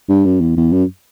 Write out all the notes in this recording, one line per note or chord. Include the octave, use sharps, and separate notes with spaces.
G2
F#2
E2
E2
F#2